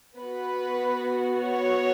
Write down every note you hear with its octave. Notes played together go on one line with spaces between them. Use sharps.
B3 F#4 B4
C#5